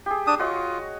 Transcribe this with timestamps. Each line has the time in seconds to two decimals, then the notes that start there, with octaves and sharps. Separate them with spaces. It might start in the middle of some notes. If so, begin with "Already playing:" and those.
0.06 G4 G#4
0.27 D4 D#6
0.39 F4 F#4 C#5 D#5